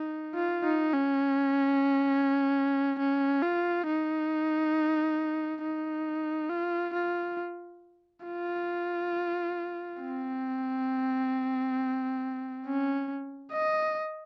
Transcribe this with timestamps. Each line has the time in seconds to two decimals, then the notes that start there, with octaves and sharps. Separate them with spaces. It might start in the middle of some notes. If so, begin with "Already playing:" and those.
Already playing: D#4
0.35 F4
0.64 D#4
0.94 C#4
2.99 C#4
3.42 F4
3.87 D#4
5.62 D#4
6.50 F4
6.94 F4
8.26 F4
10.01 C4
12.65 C#4
13.52 D#5